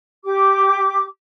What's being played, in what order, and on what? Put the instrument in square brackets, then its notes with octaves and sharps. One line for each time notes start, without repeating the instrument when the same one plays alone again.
[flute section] G4 D6